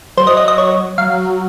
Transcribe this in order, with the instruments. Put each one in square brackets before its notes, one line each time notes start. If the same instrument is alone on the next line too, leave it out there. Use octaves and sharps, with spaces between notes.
[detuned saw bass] F#3 [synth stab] C5
[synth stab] D#5
D#5
D#5
C#5
[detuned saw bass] F#3 [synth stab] F5